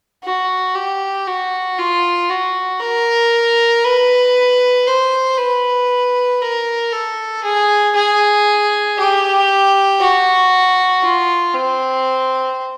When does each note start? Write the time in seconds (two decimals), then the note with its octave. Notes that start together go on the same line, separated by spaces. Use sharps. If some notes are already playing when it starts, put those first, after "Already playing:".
0.24 F#4
0.75 G4
1.27 F#4
1.78 F4
2.29 F#4
2.80 A#4
3.84 B4
4.87 C5
5.38 B4
6.41 A#4
6.92 A4
7.44 G#4
7.95 G#4
8.98 G4
10.00 F#4
11.03 F4
11.54 C4